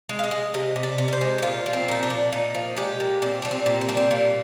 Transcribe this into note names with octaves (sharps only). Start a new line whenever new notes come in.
G#3
F5
D#5
G#3
C3 D#5
C3
D5
C3
A#4
C5
G#3
G4
A#2 F4
F3
C4
A#2 D#4
D4
A#2
A#2 D#4
F3
G#3 G4
A#2
A#2 C4
G3 D4
C4
A#2
C4
G3 D4
C4
A#2 A#3